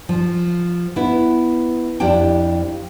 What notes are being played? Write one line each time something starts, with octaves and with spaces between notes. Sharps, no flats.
F3
B3 E4
F2 D4 E4 G4 G5